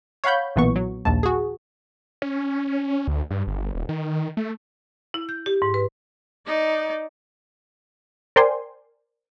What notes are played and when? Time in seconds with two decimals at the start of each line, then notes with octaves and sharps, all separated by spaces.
0.24 C#5 F5 F#5 B5 G6
0.56 B1 A#2 E3 B3 C#6
0.76 F#3
1.05 A#1 D#2 A5
1.23 F#4 G#4
2.22 C#4
3.08 D2
3.31 G2
3.47 G1
3.75 D#1
3.89 D#3
4.37 A3
5.14 E4
5.29 G6
5.46 G4
5.62 G#2
5.74 B4
6.46 D#4 D5
8.36 A#4 C5 D5 G5 G#5 C6